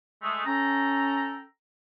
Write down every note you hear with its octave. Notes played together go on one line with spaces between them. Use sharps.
G#3 A3
C#4 A4 G5 A#5